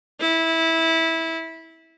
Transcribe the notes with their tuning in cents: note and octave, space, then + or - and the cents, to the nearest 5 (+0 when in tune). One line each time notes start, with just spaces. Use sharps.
E4 -15